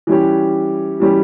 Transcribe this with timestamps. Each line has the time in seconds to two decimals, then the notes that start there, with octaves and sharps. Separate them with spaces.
0.07 E3 G3 C#4 G4
1.00 E3 G3 C#4 G4